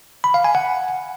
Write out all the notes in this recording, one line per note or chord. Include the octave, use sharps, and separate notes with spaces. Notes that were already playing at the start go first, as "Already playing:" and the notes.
B5
F5
G#5
F#5